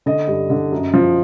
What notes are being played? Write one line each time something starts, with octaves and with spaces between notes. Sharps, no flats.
D3 D#5
G2
D3
F#2
F3